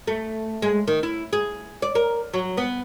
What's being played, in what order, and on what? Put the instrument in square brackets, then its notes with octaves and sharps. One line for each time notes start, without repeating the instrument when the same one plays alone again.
[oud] A3
G#3
D#3
E4
G#4
D5
A#4
F#3
B3